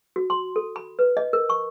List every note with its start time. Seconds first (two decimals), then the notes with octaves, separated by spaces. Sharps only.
0.16 F#4
0.30 C6
0.56 A4
0.76 B5
0.99 B4
1.17 D#5
1.33 A#4
1.50 C#6